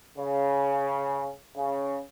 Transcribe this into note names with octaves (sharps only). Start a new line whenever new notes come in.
C#3
C#3